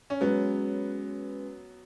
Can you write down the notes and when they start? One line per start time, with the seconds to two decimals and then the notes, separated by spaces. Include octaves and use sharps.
0.10 C#4
0.21 F#3 G#3 B3 C#4 B4